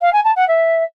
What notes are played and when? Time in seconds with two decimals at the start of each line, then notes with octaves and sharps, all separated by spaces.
0.01 F5
0.13 G#5
0.24 A5
0.36 F#5
0.48 E5